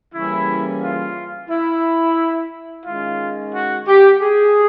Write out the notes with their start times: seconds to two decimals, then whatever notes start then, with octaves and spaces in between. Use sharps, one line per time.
0.14 C#3 E3 G3 A#3 C#4 E4
0.82 F4
1.50 E4
2.86 D#3 G#3 C#4 F4
3.55 F#4
3.88 G4
4.22 G#4